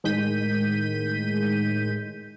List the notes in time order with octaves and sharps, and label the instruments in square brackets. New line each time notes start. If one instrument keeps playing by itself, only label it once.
[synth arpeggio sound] A2 D#3 G#3 G6 B6 D#7